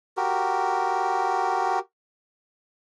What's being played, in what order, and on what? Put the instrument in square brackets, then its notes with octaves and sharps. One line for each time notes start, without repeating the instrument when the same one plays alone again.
[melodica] F#4 G4 A#4